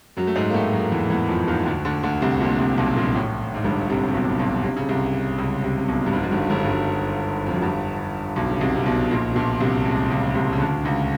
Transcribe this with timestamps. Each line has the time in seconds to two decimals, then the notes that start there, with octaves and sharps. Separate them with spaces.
0.17 F#2 F#3
0.27 A3
0.36 G#2 G#3
0.50 A#3
0.54 A2 A3
0.73 F#2 F#3
0.92 E2 E3
1.10 E2 E3
1.29 F2 F3
1.48 D#2 D#3
1.66 D2 D3
1.85 D2 D3
2.03 D2 D3
2.22 C2 C3
2.40 A#1 A#2
2.59 C2 C3
2.78 B1 B2
2.96 A#1 A#2
3.15 A1 A2
3.54 G#2
3.64 G1 G2
3.90 C2 C3
4.08 C3
4.14 B1 B2
4.39 B1 B2
4.64 C3
4.77 C#3
4.89 C2 C3
5.38 C#2 C#3
5.63 C2 C3
5.78 C3
5.88 B1 B2
6.06 G2
6.13 G#1 G#2
6.23 F#2
6.32 G1 G2
6.50 G1 G2
6.64 G2
6.69 F#2
7.46 F2
7.54 F#2
7.62 G1 G2
8.36 B1 B2
8.50 C#3
8.61 C2 C3
8.76 C3
8.86 B1 B2
9.11 A#1 A#2
9.31 B2
9.36 A#1 A#2
9.60 C2 C3
9.85 C#2 C#3
10.10 C#2 C#3
10.35 C2 C3
10.53 C#3
10.60 D2 D3
10.85 C#2 C#3